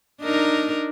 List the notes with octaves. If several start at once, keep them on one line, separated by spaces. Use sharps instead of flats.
D4 D#4 A#4